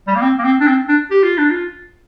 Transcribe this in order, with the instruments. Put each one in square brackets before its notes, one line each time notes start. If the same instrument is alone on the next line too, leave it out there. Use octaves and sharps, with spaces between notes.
[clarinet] G3
A#3
C4
A#3
C4
D4
C4
D4
G4
F4
D4
F4